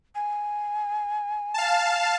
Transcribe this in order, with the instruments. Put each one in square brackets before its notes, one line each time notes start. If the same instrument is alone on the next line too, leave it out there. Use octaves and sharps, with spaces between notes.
[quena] G#5
[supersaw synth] F5 A5